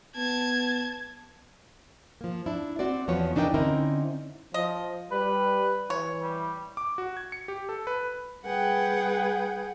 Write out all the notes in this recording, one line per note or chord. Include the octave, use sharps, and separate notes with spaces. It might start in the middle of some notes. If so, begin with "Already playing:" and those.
B3 A5 G#6
F3 A#3
D4 E4
C4 F#4 C5 D5
E2 F3 B3 F#4 C#5
E3 D4 D#4 A#4 D#5 G5
D3 C4 C#4 D#4 E4 A#4
F3 D#5
G3 B4
E3 C#5
G3
D6
F#4
G#6
C#7
G4
A4
B4
G3 G#4 B4 F#5 G5